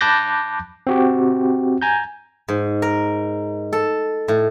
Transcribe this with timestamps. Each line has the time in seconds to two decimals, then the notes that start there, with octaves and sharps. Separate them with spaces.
0.01 A5 B5 D6 F#6 G6 A#6
0.87 C4 F#4 G4
1.82 G#5 A#5 G6
2.48 G#2
2.82 A#4
3.73 A4
4.28 A2